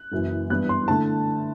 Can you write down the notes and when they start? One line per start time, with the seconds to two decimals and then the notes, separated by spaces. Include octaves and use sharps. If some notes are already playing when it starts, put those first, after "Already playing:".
Already playing: F#6
0.11 F#1 F#2 E3
0.50 G2 E3 B3 F#6
0.69 C6
0.88 D3 A3 E4 A5